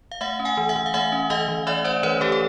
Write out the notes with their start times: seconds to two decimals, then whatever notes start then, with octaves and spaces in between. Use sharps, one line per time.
0.11 F5
0.21 A3 E5 F#5
0.39 C#4
0.45 F#5 G#5
0.57 E3
0.69 E5 F#5
0.76 E3
0.86 F5
0.94 A3 E5 F#5
1.12 C#4
1.30 E3 D#5 F5
1.48 E3
1.67 A3 D5 E5
1.84 C#4 C5 D5
2.03 E3 B4 C#5
2.21 E3 G4 A4
2.32 A4